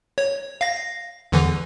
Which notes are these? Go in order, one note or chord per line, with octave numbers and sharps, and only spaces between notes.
C#5
F5 A#6
E2 D3 E3